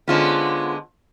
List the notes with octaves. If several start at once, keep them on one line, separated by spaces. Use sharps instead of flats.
D3 G#3 B3 C#4 F4 C5